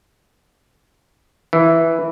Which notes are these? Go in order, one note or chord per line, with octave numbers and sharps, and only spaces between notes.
E3